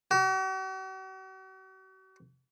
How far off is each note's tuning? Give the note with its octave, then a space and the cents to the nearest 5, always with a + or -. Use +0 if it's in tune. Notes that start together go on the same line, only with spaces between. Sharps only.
F#4 +45